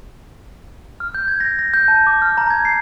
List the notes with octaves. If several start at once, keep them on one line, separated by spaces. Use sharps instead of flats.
F6
G6
G#6
A#6
A#6
G6
A5
D6
F6
A#5
G#6
C7